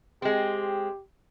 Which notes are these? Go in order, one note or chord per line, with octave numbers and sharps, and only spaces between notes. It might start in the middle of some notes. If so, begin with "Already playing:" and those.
G#3 C4 G4